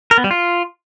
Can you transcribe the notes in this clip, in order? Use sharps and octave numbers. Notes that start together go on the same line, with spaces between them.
A#4
B3
G3
F4